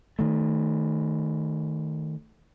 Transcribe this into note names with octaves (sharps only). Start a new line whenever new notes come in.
D#3 A3